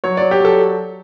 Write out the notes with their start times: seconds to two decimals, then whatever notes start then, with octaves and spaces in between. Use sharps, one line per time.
0.04 F#3 C#5
0.17 F#3 D5
0.31 G4
0.40 F#3 A4